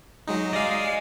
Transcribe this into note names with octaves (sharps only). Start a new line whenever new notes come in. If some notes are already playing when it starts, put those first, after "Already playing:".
F#3 G#3 D#4
D5 D#5 F5 G#5